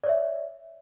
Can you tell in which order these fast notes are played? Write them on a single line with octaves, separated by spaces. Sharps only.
D5 C#5 E5